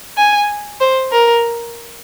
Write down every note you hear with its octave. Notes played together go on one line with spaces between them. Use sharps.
G#5
C5
A#4